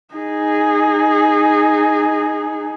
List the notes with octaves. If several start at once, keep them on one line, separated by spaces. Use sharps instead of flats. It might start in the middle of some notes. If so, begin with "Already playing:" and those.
D#4 G#4